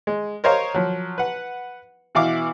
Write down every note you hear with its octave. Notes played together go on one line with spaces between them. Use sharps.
G#3
A#4 C5 C#5 D#5 F5
F3 F#3
B4 F#5
B2 E3 E4 F5 D6